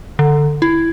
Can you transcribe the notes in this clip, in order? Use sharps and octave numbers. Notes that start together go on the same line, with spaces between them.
D3
E4